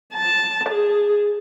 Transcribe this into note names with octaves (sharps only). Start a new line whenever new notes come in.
A5
G#4